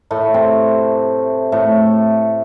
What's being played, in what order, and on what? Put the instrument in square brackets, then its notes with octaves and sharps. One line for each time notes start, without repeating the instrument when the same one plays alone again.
[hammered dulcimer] A2 A3
C3 C4
A2 A3